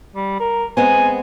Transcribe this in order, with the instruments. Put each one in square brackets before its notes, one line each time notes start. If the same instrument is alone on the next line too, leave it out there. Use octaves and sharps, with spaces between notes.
[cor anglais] G3
A#4
[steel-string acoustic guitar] G#3 B3 C4 [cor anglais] G#5